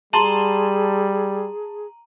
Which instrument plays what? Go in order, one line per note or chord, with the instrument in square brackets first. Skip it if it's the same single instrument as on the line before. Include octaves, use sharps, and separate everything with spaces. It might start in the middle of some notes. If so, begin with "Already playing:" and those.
[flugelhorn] G3 [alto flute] G#4 [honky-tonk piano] A5 C6 [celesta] A#5 D#7 F#7